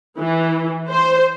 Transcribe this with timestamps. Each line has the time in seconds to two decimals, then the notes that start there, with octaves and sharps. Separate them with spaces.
0.19 E3
0.89 C5